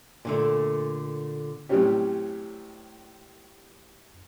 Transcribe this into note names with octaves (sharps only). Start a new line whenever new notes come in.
A#2 D3 A3
A2 C3 F#3 G3 C#4 G4